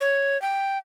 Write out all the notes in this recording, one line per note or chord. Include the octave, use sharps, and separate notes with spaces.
C#5
G5